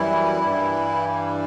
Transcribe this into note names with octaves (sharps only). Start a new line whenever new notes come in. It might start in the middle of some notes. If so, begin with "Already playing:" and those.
Already playing: F#2 E3 G3 E4
G2 E3 G3